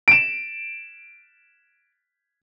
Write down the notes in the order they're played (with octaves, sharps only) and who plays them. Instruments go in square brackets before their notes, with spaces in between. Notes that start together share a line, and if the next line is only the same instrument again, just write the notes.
[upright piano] D7 E7